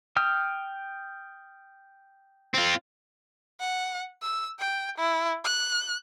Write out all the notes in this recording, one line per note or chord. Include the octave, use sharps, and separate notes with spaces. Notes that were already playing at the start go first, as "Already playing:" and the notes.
G5 D#6 F6
C4 F4
F#5
E6
G5
E4
F#6